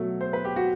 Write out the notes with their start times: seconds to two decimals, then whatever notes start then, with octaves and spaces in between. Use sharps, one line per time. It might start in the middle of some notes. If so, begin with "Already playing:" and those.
Already playing: B2 F#3 A3
0.21 C5
0.33 B4
0.45 G4
0.56 F#4